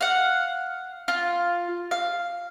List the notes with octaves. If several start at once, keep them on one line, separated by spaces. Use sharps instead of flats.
F5 F#5
F4
F5